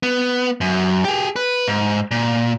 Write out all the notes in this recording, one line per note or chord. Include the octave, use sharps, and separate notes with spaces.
B3
F#2
G4 G#4
B4
G#2
A#2